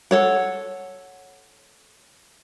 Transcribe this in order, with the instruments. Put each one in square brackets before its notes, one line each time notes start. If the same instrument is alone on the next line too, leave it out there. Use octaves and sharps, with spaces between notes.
[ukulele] A4 C#5 F#5